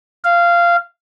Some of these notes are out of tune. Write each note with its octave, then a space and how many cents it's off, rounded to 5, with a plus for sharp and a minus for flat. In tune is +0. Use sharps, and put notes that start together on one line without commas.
F5 -15